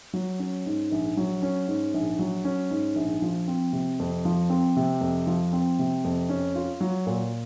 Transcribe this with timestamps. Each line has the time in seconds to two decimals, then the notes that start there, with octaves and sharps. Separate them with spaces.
0.14 F#3
0.39 C#4
0.66 G#2
0.92 A#1
1.17 F#3
1.43 C#4
1.68 G#2
1.94 A#1
2.19 F#3
2.45 C#4
2.70 G#2
2.96 A#1
3.22 F3
3.48 C4
3.73 C3
4.00 F2
4.25 F3
4.50 C4
4.77 C3
5.01 F2
5.27 F3
5.53 C4
5.79 C3
6.05 F2
6.29 C#4
6.55 F4
6.81 F#3
7.07 A#2